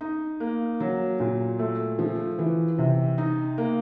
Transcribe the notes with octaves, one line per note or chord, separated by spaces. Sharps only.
D#4
A#3
F#3
A#2
A3
F3
E3
C3
D#4
A#3